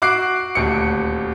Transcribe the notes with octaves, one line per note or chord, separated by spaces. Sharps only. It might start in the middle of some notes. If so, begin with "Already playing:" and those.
F#4 D6 F#6 C7 D7
D#1 D2 C#7